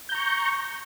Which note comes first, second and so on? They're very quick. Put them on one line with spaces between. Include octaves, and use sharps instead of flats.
G6 A#5 C#6